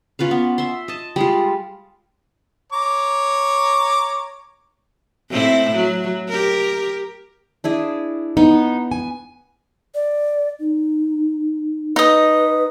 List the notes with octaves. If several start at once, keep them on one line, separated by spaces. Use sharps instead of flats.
C#4 F4 B4 F5
B3
E5 C6
D#5 A5
G3 G#3 F4
C#5 A#5 D6
A2 C4 E4
F#3
G4 A#4
D4 E4 G#4
B3 D#4
G#5
D5
D#4
D#4 B4 D#5